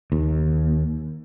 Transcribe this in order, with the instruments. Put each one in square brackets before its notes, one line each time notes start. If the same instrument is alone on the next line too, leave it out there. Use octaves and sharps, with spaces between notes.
[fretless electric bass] D#2